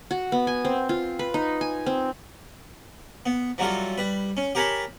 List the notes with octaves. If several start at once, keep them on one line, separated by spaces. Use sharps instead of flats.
F#4
B3
G#5
C4
F4
B4
D#4
G#5
C4
B3
E3 F#3 G3 F4 A4
G3 B4
C#4
G4 A#4 C#5 G#5 A5 B5